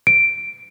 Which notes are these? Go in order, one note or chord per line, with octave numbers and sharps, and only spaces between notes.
D7